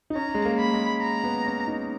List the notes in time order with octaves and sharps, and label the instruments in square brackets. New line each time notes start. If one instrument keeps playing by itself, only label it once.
[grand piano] D#4
[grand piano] C#4 [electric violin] A#5
[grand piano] G#3
A#3
[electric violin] B5
[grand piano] G#3
[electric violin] A#5
[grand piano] B3
C#4
D#4